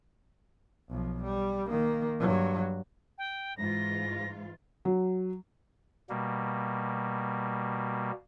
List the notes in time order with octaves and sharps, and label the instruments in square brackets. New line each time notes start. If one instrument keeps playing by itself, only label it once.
[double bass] B1 F3
G3
D#3 A#3
G2 F#3
[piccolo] G5
[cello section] G#2 E3 F4 [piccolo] A#6
[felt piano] F#3
[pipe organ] B2 G3 A#3